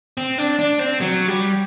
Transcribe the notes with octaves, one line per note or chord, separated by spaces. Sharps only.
C4
D4
D4
C4
F#3
G3